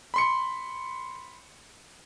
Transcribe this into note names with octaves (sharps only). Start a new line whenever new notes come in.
B5 C6 C#7